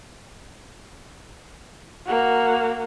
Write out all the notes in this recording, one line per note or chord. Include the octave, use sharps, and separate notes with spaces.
A#3 F#4